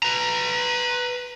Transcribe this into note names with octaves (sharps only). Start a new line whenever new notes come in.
B4 A#5